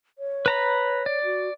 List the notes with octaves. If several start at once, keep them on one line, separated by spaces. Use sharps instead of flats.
C#5
B4 A#5 B5
D5
F#4